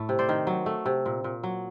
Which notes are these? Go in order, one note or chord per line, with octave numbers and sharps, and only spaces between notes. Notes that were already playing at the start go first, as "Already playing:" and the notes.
Already playing: A2 A3
C3
C5 D5
D#3
F#3
A3
C3
A#2
A#2
F#3